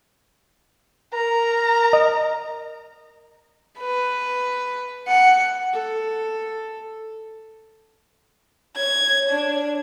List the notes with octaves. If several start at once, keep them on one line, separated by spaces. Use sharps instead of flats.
A#4 A#5
D#5
B4
F#5
A4
C#5 G#6
D4